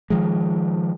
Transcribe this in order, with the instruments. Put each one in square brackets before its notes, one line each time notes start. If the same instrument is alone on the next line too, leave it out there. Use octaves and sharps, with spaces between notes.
[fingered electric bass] D#3 F3 G#3